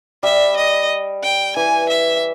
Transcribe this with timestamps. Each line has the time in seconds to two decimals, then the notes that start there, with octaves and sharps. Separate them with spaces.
0.23 G3 E5
0.57 D#5
1.23 G5
1.56 E3 G#5
1.89 E5